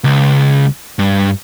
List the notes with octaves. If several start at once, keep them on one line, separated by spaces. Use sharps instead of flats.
C#2
G2